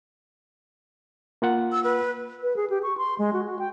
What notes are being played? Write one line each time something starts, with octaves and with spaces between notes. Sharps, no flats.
A#3 F4 F#5
E6
B4
B4
G#4
G4
C#6
C6
G#3
F#4
F#4
G5